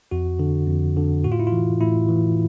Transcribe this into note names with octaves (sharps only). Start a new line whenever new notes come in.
F2 F#4
D3
F2
D3
A2 F#4
F4
E4
F4
E3
A2 E4
E3